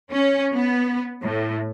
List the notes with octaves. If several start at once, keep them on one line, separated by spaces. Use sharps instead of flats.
C#4
B3
A2